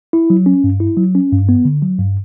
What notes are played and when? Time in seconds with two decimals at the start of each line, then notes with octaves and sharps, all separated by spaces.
0.13 E4
0.30 F#3
0.46 C#4
0.64 G2
0.80 E4
0.97 F#3
1.15 C#4
1.32 G2
1.49 B3
1.65 D3
1.82 F#3
1.98 G2